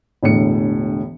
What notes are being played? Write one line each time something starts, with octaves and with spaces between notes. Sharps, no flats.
E1 A2 D3 C#7